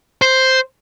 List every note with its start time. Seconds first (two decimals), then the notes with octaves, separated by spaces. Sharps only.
0.22 C5